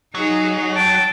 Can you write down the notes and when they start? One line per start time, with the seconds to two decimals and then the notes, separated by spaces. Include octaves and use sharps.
0.15 F#3 D#4 G#4
0.76 G5 A5